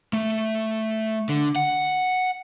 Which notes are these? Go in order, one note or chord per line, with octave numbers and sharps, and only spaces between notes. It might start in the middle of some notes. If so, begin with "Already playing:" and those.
A3
D3
F#5